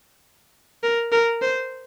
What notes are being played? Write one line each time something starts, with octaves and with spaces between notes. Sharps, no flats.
A#4
A#4
C5